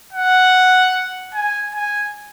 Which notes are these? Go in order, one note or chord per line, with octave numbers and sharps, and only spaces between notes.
F#5
G#5
G#5